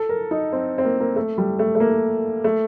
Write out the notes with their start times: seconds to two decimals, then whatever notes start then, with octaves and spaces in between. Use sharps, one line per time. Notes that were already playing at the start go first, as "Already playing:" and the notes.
Already playing: A4
0.09 A#4
0.31 D#4
0.53 C4
0.78 C4
0.85 A#3
1.00 A#3
1.16 A3
1.38 G3
1.59 A3
1.75 A3
1.80 A#3
2.44 A3